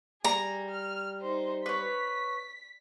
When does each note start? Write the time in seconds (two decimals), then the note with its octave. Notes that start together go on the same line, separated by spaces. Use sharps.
0.24 G3 G#4 A#5
0.71 F6
1.22 D#4 C5
1.66 B4 C#5 B6